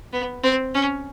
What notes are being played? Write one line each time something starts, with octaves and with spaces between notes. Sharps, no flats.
B3
C4
C#4